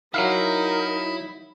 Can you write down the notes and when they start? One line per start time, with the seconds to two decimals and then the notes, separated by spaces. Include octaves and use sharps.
0.14 F#3 D#4 E4 A#4 E5 F5